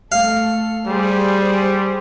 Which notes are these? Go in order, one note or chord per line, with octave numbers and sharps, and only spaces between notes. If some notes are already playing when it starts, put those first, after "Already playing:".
A3 A4 F5
G3 G4 G#4 C5